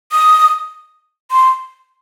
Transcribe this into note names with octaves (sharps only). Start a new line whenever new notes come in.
D#6
C6